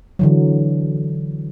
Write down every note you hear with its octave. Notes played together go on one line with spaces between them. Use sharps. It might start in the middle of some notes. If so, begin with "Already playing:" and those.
D3 E3 F#3